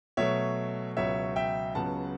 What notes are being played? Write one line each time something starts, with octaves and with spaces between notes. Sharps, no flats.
B2 F#3 A3 C#5 E5
C#2 B2 F#3 C#5 E5
E5 G5
C#2 C#3 F#3 B3 F#5 A5